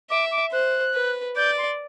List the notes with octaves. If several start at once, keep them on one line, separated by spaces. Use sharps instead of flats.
E5 D6
D6
C5 F#6
B4
D5 G6
C6